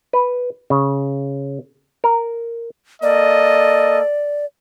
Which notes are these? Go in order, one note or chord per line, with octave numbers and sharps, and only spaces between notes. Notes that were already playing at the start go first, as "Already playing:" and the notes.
B4
C#3
A#4
A#3 A4 D5 D#5